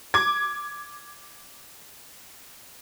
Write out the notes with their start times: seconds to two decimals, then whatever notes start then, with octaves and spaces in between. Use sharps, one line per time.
0.14 D6 G#6